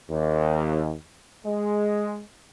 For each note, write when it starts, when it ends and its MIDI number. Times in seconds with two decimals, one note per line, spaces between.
0.10 0.94 39
1.45 2.22 56